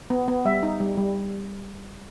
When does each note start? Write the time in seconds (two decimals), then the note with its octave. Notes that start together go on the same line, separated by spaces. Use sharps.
0.10 B3
0.28 B3
0.45 G3 E5
0.63 D#4
0.80 G3
0.97 G3